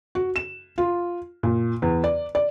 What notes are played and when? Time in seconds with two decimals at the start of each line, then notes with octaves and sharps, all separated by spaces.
0.15 F#4
0.36 E7
0.78 F4
1.43 A#2
1.82 E2
2.04 D5
2.35 D5